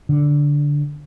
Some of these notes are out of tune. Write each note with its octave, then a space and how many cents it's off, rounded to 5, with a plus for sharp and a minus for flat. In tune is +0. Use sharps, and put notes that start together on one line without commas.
D3 -10